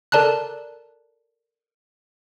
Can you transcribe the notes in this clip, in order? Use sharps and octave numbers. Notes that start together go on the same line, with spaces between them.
A4 A#4 D5 A5 A#5 F#6